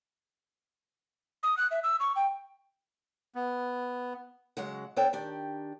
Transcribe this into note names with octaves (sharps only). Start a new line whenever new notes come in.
D#6
F#6
E5
E6
C#6
G5
B3
C#3 F#3 G#3 F#5
B3 D4 A4 C5 C#5 G5
D#3 D4 G4